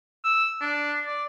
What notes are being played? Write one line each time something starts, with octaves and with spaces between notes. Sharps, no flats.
E6
D4
D5